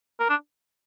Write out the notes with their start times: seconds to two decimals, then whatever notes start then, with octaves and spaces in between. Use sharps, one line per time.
0.20 A#4
0.30 D4